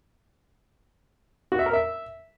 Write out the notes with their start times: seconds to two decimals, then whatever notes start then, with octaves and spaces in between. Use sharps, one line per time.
1.52 F#4
1.59 E5
1.66 A#4
1.73 E5